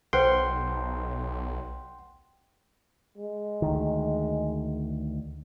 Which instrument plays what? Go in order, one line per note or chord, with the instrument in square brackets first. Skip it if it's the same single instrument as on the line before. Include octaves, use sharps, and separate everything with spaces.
[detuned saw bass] B1 [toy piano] A4 B4 C5 [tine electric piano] F#5 G5 C6
[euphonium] G#3
[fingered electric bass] D2 D#3